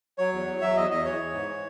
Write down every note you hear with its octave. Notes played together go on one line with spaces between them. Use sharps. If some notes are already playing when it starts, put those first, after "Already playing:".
F#3 C#5
E2
F#3
F#3 E5
E2 D#5
E2 D#5
E3 C#5
E3
G#2
E3